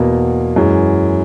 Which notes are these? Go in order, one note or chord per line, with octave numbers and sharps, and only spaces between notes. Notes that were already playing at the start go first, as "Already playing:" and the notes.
Already playing: E2 B2 A#3
F#2 E3 G#3